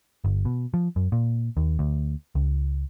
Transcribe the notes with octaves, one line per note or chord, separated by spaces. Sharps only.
G1
B2
F3
F#2
A#2
D#2
D2
C#2